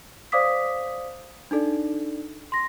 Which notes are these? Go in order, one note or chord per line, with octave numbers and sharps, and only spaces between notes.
C5 D5 F5 D6 D#6 B6
D4 D#4 A4 D5
C6 A#6